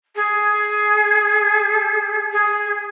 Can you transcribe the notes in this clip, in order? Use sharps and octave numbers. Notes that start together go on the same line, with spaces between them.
G#4
G#4